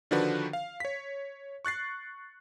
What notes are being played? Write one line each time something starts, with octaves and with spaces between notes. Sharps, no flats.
D3 D#3 F3 D4 F#4 B4
F5
C#5 B6
C#6 F#6 A6 C7